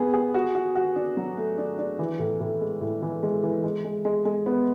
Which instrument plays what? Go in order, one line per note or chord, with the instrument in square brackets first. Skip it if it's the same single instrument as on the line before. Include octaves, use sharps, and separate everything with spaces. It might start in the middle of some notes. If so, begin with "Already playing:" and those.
Already playing: [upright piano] B3 G#4
G#4
F#4
F#4
F#4
D4
F#3
A3
D4
D4
E3
A2
A2
G#3
A2
E3
G#3
E3
G#3
G#3
G#3
G#3
B3